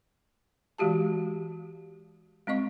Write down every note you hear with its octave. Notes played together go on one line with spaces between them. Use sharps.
E3 G#3 F#4 G4 A5
G#3 C4 D#5 C#6